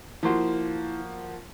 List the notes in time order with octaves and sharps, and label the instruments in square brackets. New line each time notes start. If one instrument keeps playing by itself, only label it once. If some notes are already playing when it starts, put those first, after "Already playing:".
[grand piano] F3 A#3 F#4 [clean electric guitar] E4 C6